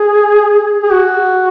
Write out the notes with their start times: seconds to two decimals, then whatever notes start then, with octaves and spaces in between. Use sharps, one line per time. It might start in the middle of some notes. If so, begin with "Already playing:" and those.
Already playing: G#4
0.83 G#4
0.91 F#4